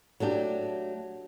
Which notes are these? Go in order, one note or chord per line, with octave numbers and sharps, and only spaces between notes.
F#3 A3 D4 G4